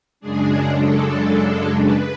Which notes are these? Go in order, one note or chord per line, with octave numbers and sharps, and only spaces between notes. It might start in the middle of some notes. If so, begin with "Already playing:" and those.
F#2 C#3 G#3 D4 G#4
A4
B4